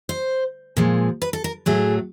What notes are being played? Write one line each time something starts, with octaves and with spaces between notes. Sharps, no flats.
C5
A#2 F3 G#3
B4
A4
A#4
A2 F#3 A3 G#4